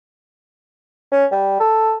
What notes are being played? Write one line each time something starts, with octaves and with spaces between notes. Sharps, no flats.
C#4
G3
A4